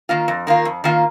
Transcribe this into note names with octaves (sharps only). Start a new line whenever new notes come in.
D#3 A#3 F4
F2
D#3 A#3 F4
F2
D#3 A#3 F4